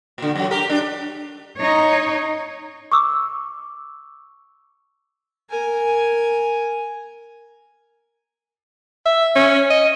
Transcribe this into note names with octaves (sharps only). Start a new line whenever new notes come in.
A#2 D3
F#2 F#3
G4 A#4
G#3 D4
D#4 C#5
C#6 D6 E6
A#4 G#5
E5
C#4
D#5